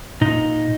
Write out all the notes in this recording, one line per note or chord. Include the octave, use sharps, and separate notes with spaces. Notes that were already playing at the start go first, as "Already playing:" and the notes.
A#2 D#4